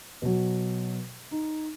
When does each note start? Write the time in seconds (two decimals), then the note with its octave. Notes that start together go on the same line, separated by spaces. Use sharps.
0.22 B2 F#3
1.31 D#4